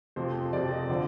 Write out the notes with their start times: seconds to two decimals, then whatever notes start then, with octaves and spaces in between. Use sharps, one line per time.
0.16 F2 C3 F3 C5
0.53 F2 C3 F3 D5
0.71 D#5
0.89 D3 F3 D5